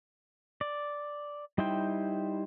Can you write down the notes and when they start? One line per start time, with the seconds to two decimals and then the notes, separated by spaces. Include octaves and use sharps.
0.61 D5
1.58 G3 D#4 E4 C5 G5